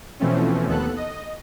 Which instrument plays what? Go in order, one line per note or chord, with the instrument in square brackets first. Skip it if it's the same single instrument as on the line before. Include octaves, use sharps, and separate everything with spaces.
[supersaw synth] B2 E3 F3 A3 C4 C#4
D#2 B3 A4 F#6
D#5